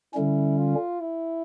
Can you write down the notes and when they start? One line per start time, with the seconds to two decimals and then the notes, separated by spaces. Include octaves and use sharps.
0.14 D3 G3 C#4 E4
0.58 F4
1.01 E4